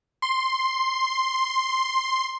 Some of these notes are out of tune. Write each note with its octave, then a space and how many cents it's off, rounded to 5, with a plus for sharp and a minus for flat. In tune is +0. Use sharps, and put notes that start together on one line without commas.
C6 +5